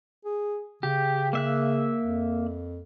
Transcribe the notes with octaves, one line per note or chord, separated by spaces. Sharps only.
G#4
C#3 G4
A#3 E5 F#6
F2